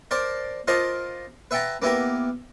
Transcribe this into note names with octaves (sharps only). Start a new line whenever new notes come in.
A#4 C5 D5 A5
F4 A#4 C5 D#5 A5 D6
B4 E5 F#5 G5 A5 A#5
A#3 B3 E4 G4 A#4